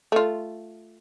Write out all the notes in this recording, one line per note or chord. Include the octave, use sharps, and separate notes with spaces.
A3 F4